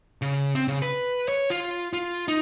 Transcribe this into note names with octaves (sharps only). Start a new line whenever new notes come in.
C#3
C4
C#3
B4
C#5
F4
F4
D#4